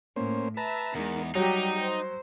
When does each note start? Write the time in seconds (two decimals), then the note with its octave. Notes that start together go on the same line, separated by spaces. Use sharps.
0.16 A2 A#3 C#4 C5
0.57 B4 E5 A5 A#5
0.95 E2 G#3 D#4 A#4
1.35 F#3 G3 D#4 G4 G5
1.79 C5